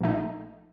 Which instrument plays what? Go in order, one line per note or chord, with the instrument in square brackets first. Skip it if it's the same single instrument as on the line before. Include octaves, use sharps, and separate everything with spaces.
[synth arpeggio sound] A#1 A#2 A3 D#4